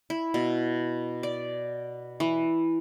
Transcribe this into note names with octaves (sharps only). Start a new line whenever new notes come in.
E4
B2
D5
E3